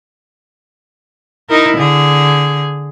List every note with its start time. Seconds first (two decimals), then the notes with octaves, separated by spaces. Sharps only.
1.49 D#4 E4 A#4
1.78 D3 G#4